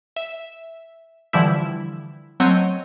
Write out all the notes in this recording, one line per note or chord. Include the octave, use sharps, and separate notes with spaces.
E5
D3 E3 F3 G3 E4
F#3 A3 C4 C#5 D#5